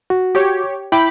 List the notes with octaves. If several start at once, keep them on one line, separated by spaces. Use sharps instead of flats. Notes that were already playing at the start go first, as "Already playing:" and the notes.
F#4
G4 C#5
E4 G5 B5 D6